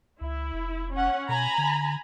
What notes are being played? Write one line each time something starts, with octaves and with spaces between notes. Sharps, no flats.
C#2 E4
F1
C#4 F#5
B2 G#5 A#5 B5
D3